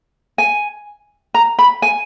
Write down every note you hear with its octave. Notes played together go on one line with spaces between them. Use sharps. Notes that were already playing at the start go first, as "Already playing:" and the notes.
G#5
A#5
B5
G#5